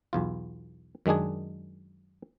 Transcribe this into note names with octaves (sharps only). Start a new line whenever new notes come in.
B1 E2 F4
F#2 D#3 G#3 D4 G#4